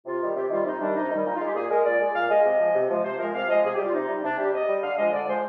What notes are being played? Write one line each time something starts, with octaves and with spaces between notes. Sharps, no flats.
C3 F4
D#3 G3
C3 G4
D#3 G3 F4
C3 D#4
D#3 G3 D4
C3 D#4
D#3 G3
A#2 D#4
F4
G#3 G4
A#2 G#4
G#3 A#4
A#2 D5
G#3
A#2 F5
G#3 D#5
C3
F3 G#3
C3
F3 G#3
C3 C5
F3 G#3 A#4
C3 F5
F3 G#3 D#5
C3 G#4
G4
G3
F4
C3 D#4
G3
C3 D4
G3 G4
C3 D#5
G3
D3 F5
F3 G#3 D#5
D3 D5
F3 G#3 C5